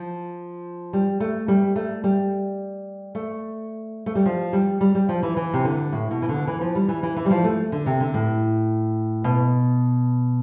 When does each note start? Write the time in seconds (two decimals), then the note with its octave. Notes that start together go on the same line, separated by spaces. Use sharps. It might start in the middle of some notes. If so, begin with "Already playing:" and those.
Already playing: F3
0.93 G3
1.20 A3
1.48 G3
1.76 A3
2.04 G3
3.15 A3
4.06 A3
4.15 G3
4.26 F3
4.53 G3
4.81 G3
4.95 G3
5.09 F3
5.23 E3
5.37 E3
5.54 C3
5.64 D3
5.92 A2
6.11 B2
6.22 E3
6.29 D3
6.47 E3
6.61 F3
6.75 G3
6.88 E3
7.03 E3
7.17 E3
7.25 G3
7.31 F3
7.44 A3
7.72 D3
7.86 C3
8.00 D3
8.14 A2
9.24 B2